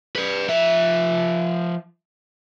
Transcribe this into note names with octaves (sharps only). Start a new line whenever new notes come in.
B4 D5
F3 E5